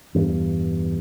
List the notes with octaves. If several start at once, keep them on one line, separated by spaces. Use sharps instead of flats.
E2 G2